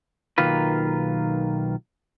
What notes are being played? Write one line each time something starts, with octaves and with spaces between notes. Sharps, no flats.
B1 D#3 A#3 F4 B4